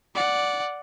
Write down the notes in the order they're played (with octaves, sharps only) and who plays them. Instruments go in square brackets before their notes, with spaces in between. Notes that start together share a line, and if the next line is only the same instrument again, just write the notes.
[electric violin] D5 F#5